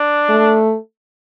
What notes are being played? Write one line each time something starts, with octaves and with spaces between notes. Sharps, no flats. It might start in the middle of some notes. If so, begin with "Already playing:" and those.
Already playing: D4
A3